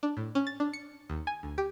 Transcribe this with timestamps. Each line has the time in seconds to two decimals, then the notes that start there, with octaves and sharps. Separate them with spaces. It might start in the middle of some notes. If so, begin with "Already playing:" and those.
0.03 D4
0.17 A2
0.35 C#4
0.47 A6
0.60 D4
0.73 C#7
1.10 D#2
1.27 G#5
1.43 D2
1.58 G4